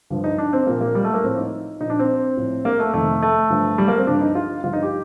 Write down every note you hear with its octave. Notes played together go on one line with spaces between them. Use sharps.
G2 D3 F3
D#4
D4
C4
A#2 F3 A#3
A#3
G3
A3
A#3
A2 F3 C4
D#4
A#2 F3 D#4
D4
C4
A2 F3
A#3
A3
F2 C3 D#3 A3
A3
G2 D3 F3
G3
A#3
C4
G2 D3 F3 D4
D#4
F4
G2 D3 F3 F4
D#4
G4